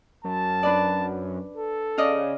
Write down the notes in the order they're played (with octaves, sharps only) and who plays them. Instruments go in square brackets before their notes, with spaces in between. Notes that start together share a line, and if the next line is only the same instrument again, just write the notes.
[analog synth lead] F#2 [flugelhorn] A5
[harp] D4 B4 D5
[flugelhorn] A4
[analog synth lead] C#3 [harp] D5 D#5 F5